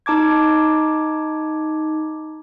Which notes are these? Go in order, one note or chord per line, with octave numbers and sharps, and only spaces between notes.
D#4 A5 D6 G#6